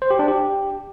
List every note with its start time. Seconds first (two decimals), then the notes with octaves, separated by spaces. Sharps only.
0.02 C5
0.11 G4
0.19 D4
0.28 G4